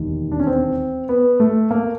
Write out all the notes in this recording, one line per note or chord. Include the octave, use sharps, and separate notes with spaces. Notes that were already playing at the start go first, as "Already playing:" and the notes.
Already playing: E1 D#2 D#3
D4
C#4
C4
B3
A3
A#3